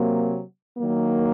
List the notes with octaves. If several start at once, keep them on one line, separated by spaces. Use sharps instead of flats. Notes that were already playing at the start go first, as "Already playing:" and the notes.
Already playing: C3 F#3 A#3
D#3 F#3 A#3